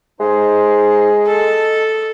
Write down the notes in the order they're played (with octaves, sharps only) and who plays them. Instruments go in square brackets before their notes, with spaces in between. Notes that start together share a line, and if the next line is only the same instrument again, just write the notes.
[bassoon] G#3 [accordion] D#4 C5 C6
[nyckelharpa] A4 [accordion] D#5 A5